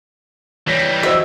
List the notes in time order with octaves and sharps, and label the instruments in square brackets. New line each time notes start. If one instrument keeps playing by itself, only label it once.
[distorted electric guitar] E3 G3 [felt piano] C#5 A#6 B6
[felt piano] F#4 C5 D#5 [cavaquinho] E5